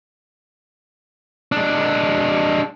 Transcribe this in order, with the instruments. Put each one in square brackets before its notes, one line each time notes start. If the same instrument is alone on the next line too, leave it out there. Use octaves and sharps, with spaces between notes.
[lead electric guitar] G#3 D4